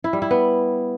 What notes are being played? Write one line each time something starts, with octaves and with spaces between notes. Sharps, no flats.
E4
G3
E4
B3